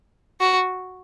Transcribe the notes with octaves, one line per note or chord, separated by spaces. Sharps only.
F#4